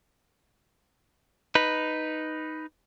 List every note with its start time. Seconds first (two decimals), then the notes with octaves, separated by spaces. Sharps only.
1.55 D#4 B4